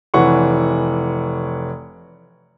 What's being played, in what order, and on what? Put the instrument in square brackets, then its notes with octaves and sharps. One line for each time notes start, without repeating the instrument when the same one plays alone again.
[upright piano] F1 E3 C#5 F#5 C#6